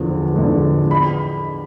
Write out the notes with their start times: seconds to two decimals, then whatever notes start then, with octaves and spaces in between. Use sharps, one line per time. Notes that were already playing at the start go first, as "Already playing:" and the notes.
Already playing: E2 D3 F3
0.34 E2 D3 F3
0.91 B5